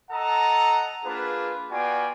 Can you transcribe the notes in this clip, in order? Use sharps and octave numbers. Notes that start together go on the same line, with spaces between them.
A4 D#5 F#5 A5 A#5
A#3 D4 F4 G#4 B4
B3 F4 F#4 D5 G5 G#5